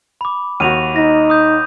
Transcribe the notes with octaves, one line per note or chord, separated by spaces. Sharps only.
B5 D6
D#2 F#4 D#7 F7
D#4 A#6
D#6 G6